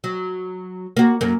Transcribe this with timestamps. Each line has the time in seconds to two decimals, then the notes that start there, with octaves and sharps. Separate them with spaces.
0.04 F#3
0.97 A#3 F#4
1.21 F#2 A#3